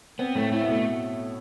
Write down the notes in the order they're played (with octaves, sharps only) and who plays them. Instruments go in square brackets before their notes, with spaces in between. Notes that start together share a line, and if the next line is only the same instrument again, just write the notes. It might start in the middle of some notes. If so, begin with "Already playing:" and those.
[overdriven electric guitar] B3 [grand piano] C4
[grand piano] A2 [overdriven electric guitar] A3
[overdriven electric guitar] A3 [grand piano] E4
[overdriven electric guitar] B3
[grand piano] B2 [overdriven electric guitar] A3